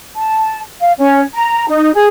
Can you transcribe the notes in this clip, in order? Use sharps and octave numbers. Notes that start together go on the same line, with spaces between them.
A5
F5
C#4
A#5
D#4
G#4